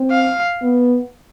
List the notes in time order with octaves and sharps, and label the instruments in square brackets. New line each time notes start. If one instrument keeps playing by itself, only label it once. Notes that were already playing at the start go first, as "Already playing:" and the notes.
Already playing: [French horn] C4
[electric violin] F5
[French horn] B3